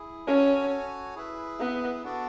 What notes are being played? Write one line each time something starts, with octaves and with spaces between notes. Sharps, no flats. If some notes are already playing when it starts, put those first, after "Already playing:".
Already playing: E4 G#4
C#4 F#4 A4 C#5 G#5
E4 G#4 B4 E5
B3
B3 D4 F#4 A4 D5